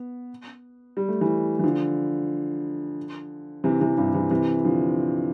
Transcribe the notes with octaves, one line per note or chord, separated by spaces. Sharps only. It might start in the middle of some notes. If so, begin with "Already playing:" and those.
Already playing: B3
G3
A3
E3 G3
E3
D3 F3
C3 E3
C3 E3
G2
C3 E3
C3 E3
D3 F3